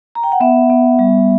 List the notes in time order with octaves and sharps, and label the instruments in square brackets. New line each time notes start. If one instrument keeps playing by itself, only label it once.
[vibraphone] A#5
G5
F#5
B3 E5
B3
G3